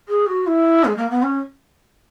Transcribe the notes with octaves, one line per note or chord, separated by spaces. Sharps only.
G#4
F#4
E4
G#3
A#3
B3
C#4